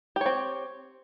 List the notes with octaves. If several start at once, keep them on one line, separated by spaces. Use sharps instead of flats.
C4 G4 C#5